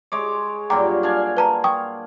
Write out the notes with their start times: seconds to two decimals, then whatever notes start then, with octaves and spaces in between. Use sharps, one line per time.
0.12 G#3 C#5 D6
0.70 G2 A#2 F#3 G5 A#5 D6
1.03 D4 F5 G#5
1.37 B4 A5 A#5
1.64 G5 C#6 D#6